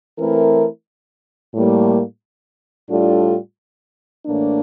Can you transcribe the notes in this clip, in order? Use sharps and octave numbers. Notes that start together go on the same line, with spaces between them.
E3 A3 C4 E4 A#4
A2 G3 A#3
A2 G3 D4 F4 A4
A2 E3 A#3 D4